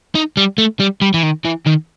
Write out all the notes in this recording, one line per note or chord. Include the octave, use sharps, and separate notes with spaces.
D#4
G3
A3
G3
G3
E3
D#3
E3
D#3